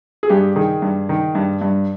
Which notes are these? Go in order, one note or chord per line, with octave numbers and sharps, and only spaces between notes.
G#4
G2 G4
D#3 G#4
G2
D#3
G2
G2